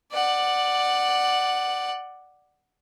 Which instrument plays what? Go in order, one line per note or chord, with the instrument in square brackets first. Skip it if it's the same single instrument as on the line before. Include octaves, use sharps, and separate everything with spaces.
[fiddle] D5 F#5